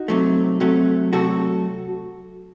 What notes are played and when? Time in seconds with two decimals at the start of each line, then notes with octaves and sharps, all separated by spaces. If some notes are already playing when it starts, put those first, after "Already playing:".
Already playing: D#4 F#4
0.08 C3 F#3 A3
0.60 C3 F#3 A3
1.13 C3 F#3 A3 F#4 A4